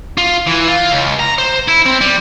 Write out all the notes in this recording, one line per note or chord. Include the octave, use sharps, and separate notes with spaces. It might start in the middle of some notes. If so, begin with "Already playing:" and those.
F4
E3
F4
C#2
A#5
C5
E4
C4
G3